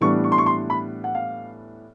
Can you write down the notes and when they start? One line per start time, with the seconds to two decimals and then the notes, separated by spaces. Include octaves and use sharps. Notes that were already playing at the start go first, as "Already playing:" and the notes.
0.01 A2 E3 G3 B3 D4 C#6
0.24 C#6
0.32 C6
0.38 C#6
0.46 C6
0.70 B5
1.04 F#5
1.15 F5